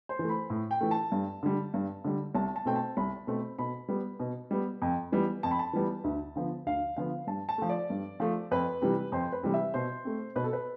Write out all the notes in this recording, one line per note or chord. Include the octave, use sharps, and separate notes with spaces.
C5
E3
A3 B5
A2
G5
E3 A3
A5
G2
D3 G3
G2
D3 G3
C2 A5
A5
B2 A3 C4 G5
A5
C2 B5
B2 A3 C4
B2 B5
G3 B3
B2
G3 B3
F2
E3 G3 B3
F2 A5
B5
A5
E3 G3 B3
D2
D3 F3 B3
D2 F5
D3 F3 B3 F5
G2 A5
A5
F3 A3
D5
G2
F3 A3
F2 B4
C3 E3 G3
F2 C5
B4
C3 E3 G3
E5
B2 C5
A3 C4
B2 B4
A4
B4